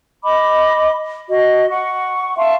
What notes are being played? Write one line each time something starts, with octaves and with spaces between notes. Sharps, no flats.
D#5 B5 D6
F#4 D#5
F#5 C#6
E5 F5 A5 C6